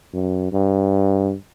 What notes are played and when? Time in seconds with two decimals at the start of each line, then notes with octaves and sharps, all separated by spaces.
0.14 F#2
0.52 G2